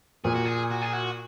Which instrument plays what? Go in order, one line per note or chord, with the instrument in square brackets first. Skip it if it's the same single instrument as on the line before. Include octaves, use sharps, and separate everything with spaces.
[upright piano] A#2 [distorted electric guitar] G#4
[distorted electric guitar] F#4
G#4
F#4
G#4
F#4